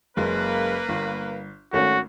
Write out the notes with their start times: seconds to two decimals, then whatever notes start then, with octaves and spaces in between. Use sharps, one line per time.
0.17 F#1 G#3 A#3 B4
0.89 G1
1.73 G#1 A3 C#4 F#4